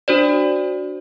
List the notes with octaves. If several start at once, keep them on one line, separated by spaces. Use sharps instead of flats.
D4 F#4 C5 D5